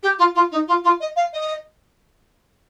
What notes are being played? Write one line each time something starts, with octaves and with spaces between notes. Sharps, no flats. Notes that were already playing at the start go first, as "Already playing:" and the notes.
G4
F4
F4
D#4
F4
F4
D#5
F5
D#5